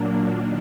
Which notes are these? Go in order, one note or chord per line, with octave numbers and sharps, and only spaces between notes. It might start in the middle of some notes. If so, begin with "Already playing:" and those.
Already playing: A#2 F#3 A#3 D4
D#3